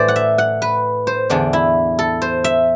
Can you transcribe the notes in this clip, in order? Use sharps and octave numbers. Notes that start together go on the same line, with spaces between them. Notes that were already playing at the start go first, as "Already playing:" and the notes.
Already playing: A2 E3 C5 D5
F#5
E5
F#5
B4
C5
E2 D3 D4
E4
A4
C5
E5